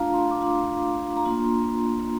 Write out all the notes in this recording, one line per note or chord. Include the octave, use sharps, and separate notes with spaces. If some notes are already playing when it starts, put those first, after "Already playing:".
Already playing: A3 D4 F4 F5 A#5
C6
D6
A3 D4 F4 C6
A#5
A#3 D4 F4 C6